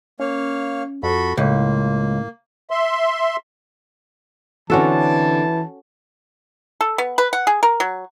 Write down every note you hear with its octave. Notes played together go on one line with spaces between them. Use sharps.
A#3 C#4 C#5 F5
F2 F#4 A4 B5
C#2 A2 A#3
E5 C6
D3 E3 C4 C#4 F#4 A4 A5
A4
B3
B4
F#5
G#4
A#4
F#3